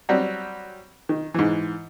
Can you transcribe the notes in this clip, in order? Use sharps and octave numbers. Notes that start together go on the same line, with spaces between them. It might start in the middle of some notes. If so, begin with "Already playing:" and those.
F#3 G3 C4
D#3
G#2 E3